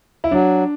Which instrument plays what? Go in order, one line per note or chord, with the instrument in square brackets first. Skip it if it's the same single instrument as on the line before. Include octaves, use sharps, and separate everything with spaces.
[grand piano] E4
[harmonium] F#3 [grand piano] D4